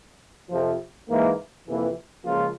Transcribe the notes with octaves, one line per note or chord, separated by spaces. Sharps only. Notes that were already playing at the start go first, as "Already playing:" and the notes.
F2 C3 F3
G#2 E3 A#3
F2 C3 E3 A#3
C#2 C#3 F3 A#3 F4